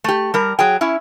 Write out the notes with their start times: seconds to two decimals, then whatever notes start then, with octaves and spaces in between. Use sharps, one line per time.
0.04 A3 G4
0.34 G3 A#4
0.59 F#3 G#4 G5
0.81 C#4 E4